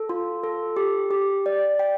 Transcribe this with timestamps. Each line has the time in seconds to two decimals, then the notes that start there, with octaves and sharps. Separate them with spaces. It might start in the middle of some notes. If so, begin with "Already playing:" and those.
Already playing: A4
0.09 F4
0.44 A4
0.77 G4
1.11 G4
1.46 D5
1.79 G5